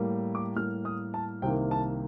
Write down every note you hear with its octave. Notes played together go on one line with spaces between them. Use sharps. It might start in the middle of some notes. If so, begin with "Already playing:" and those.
Already playing: A2 G3 A#3
D6
A2 G3 A#3 F6
D#6
A5
C2 C3 D#3 A#3 G5
A5